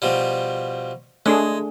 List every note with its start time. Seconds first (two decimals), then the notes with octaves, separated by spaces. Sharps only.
0.02 B2 F3 G3
1.26 G#3 A3 D4 G#4